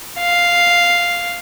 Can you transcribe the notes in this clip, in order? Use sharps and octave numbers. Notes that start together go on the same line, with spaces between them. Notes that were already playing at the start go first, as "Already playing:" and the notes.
F5